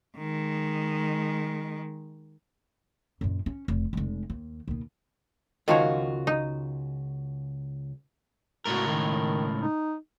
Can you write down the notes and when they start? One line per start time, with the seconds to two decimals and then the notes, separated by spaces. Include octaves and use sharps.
0.18 D#3 G#3
3.21 F#2 A#2
3.46 C#4
3.68 F1
3.93 F1 G#3
4.30 D#2
4.68 D#2 B2
5.68 C#2 D#3 F3 F4 F#4 C#5
6.27 D#4
8.65 C#2 A2 F#4 A#4
8.86 D#3
9.60 D#4